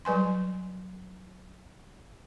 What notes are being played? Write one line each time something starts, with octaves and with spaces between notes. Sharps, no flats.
F#3 G3 B4 G#5 C6